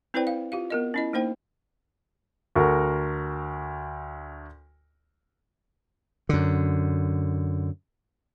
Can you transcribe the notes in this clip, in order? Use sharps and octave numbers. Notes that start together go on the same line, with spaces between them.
C4 E4 B4 C5 D5 G5
F5
F4 G4 F5
B3 A#4 D#5
C#4 E4 D#5
A#3 D#4 C5 G5
D2 F#4 A4 A#4 C#6
F#2 D3